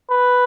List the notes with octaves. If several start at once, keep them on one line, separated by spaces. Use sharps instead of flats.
B4